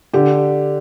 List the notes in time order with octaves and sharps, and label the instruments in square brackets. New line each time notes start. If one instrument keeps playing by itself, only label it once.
[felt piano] D3 G4